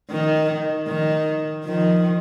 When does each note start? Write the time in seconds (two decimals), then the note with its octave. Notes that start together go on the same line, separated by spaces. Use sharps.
0.10 D#3
0.87 D#3
1.64 D#3 F3